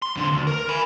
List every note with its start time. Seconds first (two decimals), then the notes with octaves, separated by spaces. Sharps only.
0.02 C6
0.16 F2 D3
0.33 D2
0.47 A#4
0.69 G#5 B5